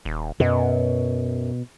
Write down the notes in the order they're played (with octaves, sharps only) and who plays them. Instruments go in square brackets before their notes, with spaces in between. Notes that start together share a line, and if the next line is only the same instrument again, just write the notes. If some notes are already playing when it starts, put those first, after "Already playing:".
[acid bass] D#1
[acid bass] F#2 [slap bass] B2